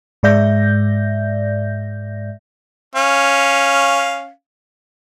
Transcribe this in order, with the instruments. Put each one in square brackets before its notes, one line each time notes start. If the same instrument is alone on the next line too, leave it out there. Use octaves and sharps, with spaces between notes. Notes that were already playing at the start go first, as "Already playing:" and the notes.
[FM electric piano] G#2 G#3 D5 E5 G6 A#6
[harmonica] C#4 F5